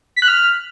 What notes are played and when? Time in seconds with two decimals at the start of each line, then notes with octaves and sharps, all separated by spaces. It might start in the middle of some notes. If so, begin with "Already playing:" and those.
0.16 B6
0.22 F#6
0.28 F6